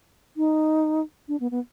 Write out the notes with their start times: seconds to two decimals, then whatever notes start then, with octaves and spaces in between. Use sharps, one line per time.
0.37 D#4
1.28 D4
1.40 B3
1.51 B3